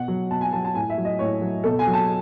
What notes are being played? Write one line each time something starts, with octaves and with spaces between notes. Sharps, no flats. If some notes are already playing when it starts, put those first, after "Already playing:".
Already playing: B2 F#5
F#3
B2 A5
G#5
F#3 A5
A5
A2 G#5
E5
F#3
D#5
A2 C#5
F#3
B2 A4
G#5
F#3
A5